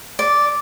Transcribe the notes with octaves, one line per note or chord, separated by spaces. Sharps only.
D5